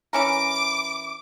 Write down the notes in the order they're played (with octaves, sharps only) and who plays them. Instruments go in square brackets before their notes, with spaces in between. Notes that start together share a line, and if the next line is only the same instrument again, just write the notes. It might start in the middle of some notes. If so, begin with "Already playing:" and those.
[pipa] E3 C#4 A#4 [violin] D6